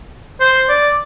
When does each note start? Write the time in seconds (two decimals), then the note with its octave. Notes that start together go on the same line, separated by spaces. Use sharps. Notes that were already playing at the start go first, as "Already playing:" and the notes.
0.40 C5
0.69 D5